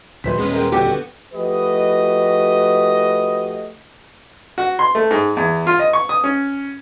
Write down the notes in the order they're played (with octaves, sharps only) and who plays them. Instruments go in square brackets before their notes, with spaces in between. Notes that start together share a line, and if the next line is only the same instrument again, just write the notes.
[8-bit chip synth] A#1 [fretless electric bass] D#2 F#3 [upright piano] B4 C5 B6
[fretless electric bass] D#1 [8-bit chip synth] G#3 B3 C#4
[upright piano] A#4 C5 G5
[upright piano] F2 D3 G6 [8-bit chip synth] B3 F#4 [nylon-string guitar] G4
[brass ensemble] F3 A3 F#4 G4 B4 D#5
[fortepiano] F#4
C6
A3
G#2
E2
F4
D#5
C#6
D#6
C#4